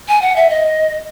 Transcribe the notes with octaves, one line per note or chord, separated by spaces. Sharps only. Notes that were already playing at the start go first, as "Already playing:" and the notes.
G#5
F#5
E5
D#5